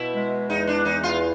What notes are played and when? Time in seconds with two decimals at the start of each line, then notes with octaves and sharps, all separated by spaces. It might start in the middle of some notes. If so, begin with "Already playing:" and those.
Already playing: B2 E4
0.13 G#3
0.49 E2 D#4
0.67 D4
0.85 E2 D#4
1.03 F4